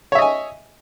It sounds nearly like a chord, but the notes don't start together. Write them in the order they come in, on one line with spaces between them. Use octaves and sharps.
C#5 E5 D#5 G#5